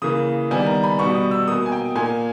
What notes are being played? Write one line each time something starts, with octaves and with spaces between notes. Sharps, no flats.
C#3 E3 A#3 D#6
D#3 G3 B3 G#5
A#5
B5
B2 G3 B3 C#6
D#6
E6
B2 A#3 D#6
G#5
G5
A#2 A#3 G#5